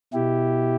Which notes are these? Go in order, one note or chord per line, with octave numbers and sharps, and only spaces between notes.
B2 E4 G4